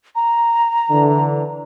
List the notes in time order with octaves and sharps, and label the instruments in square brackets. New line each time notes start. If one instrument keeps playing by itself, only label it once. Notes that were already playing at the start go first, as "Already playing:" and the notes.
[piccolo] A#5
[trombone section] D3 E3